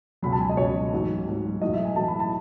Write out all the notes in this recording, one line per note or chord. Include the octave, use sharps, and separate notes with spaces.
C#2 B2 F#3 B5
A5
G#5
D#5
C#2 B2 F#3 C#5
A1 G#2 F#3
A1 G#2 F#3
B1 A2 E3 D#5
E5
G#5
B1 A2 E3 A5
B5
A5